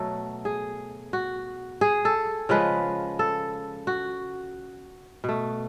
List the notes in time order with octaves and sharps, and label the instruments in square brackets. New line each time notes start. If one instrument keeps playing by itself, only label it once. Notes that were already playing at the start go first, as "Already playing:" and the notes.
Already playing: [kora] B2 F#3 A3 A4
G#4
F#4
G#4
A4
C#3 F3 G#3 B4
A4
F#4
B2 A3